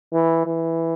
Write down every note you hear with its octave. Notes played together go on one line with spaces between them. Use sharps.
E3
E3